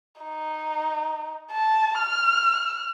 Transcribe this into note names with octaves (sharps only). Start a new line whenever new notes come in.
D#4
A5
F6